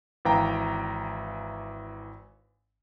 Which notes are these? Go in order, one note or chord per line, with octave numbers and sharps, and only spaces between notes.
G#1 E3 F5 G5 A#5